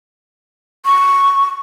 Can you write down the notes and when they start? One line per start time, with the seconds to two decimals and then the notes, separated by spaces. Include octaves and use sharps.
0.86 C#6